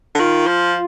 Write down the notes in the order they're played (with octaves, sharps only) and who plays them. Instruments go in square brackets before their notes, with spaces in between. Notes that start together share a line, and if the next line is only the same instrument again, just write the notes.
[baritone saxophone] D3
[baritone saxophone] D#3 [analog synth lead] F4
[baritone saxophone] F3